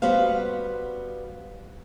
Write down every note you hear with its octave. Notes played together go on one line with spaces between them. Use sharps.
G3 B3 F#4 C5 F5